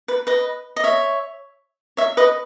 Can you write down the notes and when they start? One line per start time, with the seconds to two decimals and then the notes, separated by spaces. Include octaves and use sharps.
0.08 B4
0.27 B4 D#5
0.76 D#5
0.84 C#5 E5
1.97 C#5 E5
2.17 B4 D#5